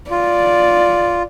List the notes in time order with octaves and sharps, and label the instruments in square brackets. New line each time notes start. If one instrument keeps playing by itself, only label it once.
[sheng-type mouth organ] F4 [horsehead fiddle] D5